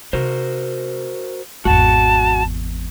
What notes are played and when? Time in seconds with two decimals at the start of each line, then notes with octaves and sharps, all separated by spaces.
0.13 C3 F#4 A#4 C5
1.65 G#1 E2 F#4 F#5 A5